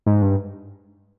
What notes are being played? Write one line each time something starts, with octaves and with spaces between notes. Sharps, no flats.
G#2
G2